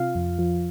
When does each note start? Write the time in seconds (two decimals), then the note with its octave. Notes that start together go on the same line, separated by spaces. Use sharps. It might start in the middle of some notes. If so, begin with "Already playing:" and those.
Already playing: C3 F4 F5
0.15 F2
0.38 F3